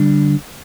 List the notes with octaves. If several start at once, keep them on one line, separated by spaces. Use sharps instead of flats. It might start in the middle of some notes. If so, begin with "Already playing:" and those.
Already playing: D3 G3 D4